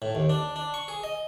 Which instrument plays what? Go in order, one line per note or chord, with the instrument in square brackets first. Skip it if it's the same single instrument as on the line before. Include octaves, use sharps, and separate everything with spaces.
[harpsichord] A2
D#2
D4
D4
C#6
G#4
D#5